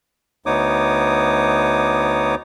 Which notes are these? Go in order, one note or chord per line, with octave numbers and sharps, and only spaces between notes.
D2 B3 D#4 C#5 D6 D#6